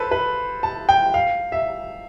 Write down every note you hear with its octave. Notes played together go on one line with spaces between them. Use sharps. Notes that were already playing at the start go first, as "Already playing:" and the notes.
Already playing: A4 B4 C5
B4
A5
G5
F5
E5